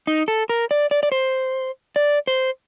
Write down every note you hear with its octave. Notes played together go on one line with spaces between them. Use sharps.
D#4
A4
A#4
D5
D5
D5
C5
D5
C5